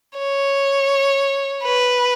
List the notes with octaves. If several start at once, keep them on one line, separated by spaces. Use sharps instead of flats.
C#5
B4